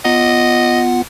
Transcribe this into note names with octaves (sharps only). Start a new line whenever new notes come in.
B3 F4 D#5 F#5